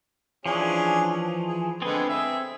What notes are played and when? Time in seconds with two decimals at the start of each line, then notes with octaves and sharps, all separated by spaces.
0.46 E3 F3 C#4 D4 G#4
1.48 G#4
1.82 D3 G#3 B3 C4 G#4
2.09 E5